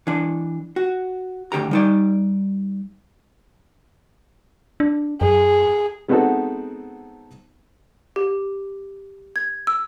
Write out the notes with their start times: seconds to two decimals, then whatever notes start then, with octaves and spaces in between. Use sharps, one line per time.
0.07 E3 D4
0.76 F#4
1.52 D2 G2 D3 G4 A#5
1.71 G3 D#4 D5
4.80 D4
5.21 F#2 G#4
6.08 G#3 B3 C4 D#4 F#4 A4
8.16 G4
9.36 G#6
9.67 E6